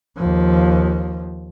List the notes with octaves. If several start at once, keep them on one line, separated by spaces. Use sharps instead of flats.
D#2 F3